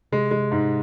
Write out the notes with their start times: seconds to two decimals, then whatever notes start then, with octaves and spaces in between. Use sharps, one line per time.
0.12 C3 G#3
0.31 G#3
0.52 G#2